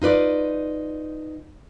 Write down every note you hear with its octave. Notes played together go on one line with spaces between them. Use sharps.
D#4 F4 B4 D5